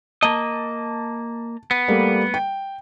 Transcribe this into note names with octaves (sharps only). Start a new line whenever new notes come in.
A#3 D#5 A5
B3
G3 A3 A#3
G5